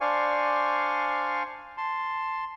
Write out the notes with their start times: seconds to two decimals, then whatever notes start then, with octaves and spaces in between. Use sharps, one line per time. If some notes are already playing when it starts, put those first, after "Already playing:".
0.01 D4 C5 D5 F5 G#5 C#6
1.77 A5 C6